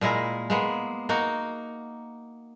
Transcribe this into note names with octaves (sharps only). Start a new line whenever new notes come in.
A#2 G#3 E4 A#4
G#3 A#3 B3
A#3 D#4 F#4